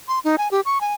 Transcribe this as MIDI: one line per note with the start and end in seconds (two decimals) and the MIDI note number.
0.08 0.19 84
0.24 0.36 63
0.38 0.48 80
0.51 0.61 67
0.65 0.81 85
0.81 0.94 80